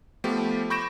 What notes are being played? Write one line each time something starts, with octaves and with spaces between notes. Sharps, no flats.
F3 A3 B3 G4
B5 C#6 G6 A#6 D7 E7